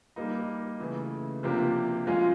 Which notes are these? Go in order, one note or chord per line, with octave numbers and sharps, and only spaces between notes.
G3 A#3 D#4
C#3 E3 A3
C3 F3 A#3 D4 G4
F3 G#3 C#4 F4 G#4